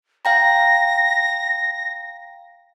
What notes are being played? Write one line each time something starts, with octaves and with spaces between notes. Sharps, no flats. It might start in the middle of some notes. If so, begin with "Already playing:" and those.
F5 G5 A#5 A#6